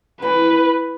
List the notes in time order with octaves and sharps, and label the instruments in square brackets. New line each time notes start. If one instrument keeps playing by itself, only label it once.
[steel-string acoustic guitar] E3 [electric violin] B4